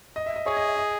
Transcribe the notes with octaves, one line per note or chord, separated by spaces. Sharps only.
D#5
E5
D#5
G#4 C#5
D#5
E5
D#5